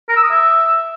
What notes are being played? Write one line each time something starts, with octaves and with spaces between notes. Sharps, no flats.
A#4
E6
D#6
E5